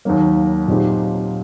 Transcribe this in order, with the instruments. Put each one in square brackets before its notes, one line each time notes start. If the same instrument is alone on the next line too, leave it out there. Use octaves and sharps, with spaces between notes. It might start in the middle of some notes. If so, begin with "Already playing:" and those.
[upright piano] D#2 D#3 F#3 A#3
A#2 F#3 C4 D#4 G4